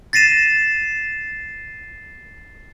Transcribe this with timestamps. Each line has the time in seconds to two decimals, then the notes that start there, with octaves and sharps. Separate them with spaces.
0.13 A6 A#6 C7 D#7 E7